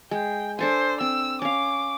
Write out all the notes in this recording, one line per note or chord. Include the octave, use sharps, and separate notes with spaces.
G#3 G5
D4 A4 C5 G#5
C4 E6
C#4 F5 D6